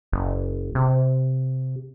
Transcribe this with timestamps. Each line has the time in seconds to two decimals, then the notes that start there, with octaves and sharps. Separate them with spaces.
0.12 F#1
0.75 C3